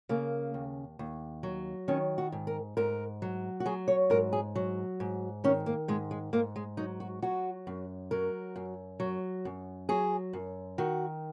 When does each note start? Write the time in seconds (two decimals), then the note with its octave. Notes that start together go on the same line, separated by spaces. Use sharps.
0.09 C#3 A#3
0.54 D#2
0.99 D#2
1.43 F#3
1.88 D#3 C#4
2.18 F#4
2.32 G#2
2.47 A#4
2.77 G#2 A#4
3.22 F#3
3.60 F#4
3.66 F#3 G#4
3.88 C#5
4.10 G#2 A#4
4.33 G#4
4.56 F#3
5.00 G#2
5.44 D#3 C#4
5.66 A#3
5.88 G#2 G#3
6.11 G#3
6.33 G#2 A#3
6.56 G#3
6.77 F#3 D#4
7.00 F#4
7.22 F#3 F#4
7.67 F#2
8.11 F#3 A#4
8.56 F#2
9.00 F#3
9.45 F#2
9.89 F#3 G#4
10.33 F#2
10.78 D#3 F#4